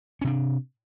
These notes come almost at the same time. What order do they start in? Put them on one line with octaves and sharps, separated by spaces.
C#4 C3 D4